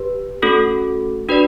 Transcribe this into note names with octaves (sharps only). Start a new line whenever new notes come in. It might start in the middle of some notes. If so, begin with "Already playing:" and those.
Already playing: G4 B4
A3 C#4 F#4 A4
D4 F#4 B4 D5